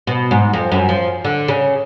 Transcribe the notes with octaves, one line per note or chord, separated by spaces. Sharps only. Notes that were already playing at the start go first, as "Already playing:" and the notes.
B2
G#2
F2
F#2
F3
D3
C#3